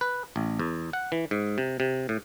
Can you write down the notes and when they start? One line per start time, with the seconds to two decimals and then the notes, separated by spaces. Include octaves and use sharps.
0.01 B4
0.36 A1
0.59 E2
0.93 F#5
1.12 E3
1.31 G#2
1.58 C3
1.80 C3
2.09 A2